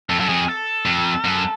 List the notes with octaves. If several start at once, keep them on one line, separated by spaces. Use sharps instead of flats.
F2 A4
F#2 A4
F2 G#4
A4
F2
F#2